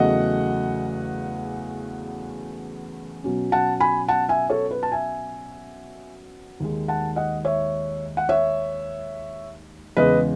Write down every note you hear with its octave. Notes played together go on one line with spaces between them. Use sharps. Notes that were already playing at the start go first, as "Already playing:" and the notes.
Already playing: E2 C#3 F#3 A3 D#5 F#5
B2 F#3 C#4
F#5 A5
G#5 B5
F#5 A5
E5 G#5
A4 C#5
B4
A5
E5 G#5
D#2 D#3 G#3
F#5 A5
D#5 F#5
C#5 E5
F#5
C#5 E5
E2 C#3 G#3 B4 D#5